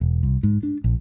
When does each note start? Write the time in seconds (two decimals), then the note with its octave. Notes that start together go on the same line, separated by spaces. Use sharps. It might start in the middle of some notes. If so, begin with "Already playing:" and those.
0.01 E1
0.23 C2
0.43 G#2
0.63 D4
0.84 A#1